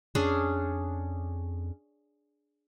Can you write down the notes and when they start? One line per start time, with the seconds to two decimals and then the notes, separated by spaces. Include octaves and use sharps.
0.15 F2 C#4 D4 G#4